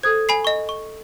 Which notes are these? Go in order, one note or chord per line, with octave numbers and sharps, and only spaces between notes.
A4 C5 D#6 G#6
G#5 B5 C7
D#5 C#6
C#6